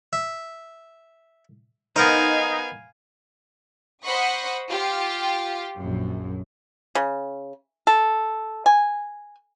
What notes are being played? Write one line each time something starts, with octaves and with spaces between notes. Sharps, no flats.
E5
B3 D#4 A#4 C5 F5 G#5
C5 D#5 F#5 B5 C#6 D#6
F4 G4
A#1 F#2
C#3
A4
G#5